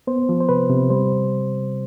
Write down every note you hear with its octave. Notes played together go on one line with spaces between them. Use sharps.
B3 C5
F3
C5
C3 B4
C3
G3 C5